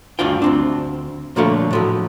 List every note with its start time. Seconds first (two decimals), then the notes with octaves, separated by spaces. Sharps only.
0.19 D2 G2 D4 F4 G5
0.42 D2 C4 D4
1.36 A#2 D3 F3 A3 C#5 F5
1.71 A2 F3 F#3